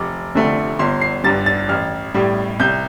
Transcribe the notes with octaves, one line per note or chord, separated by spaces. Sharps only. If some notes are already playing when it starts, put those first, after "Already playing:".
Already playing: F1 D6
F2 D3 A3
G1 C6
C7
G2 G3 A6
A6
A1 F6
A2 G3
C2 G6